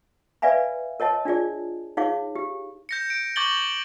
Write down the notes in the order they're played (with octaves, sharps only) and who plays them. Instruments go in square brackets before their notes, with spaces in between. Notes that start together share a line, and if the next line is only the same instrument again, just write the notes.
[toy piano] B4 D5 E5 F5 G#5 B5
A#4 C#5 D#5 A5
D4 F4 G#4 D5
D#4 G#4 C#5 F5 D6
G4
[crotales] G6 A#6 C#7
D7
C#6 D6 G6 A6 F#7 G7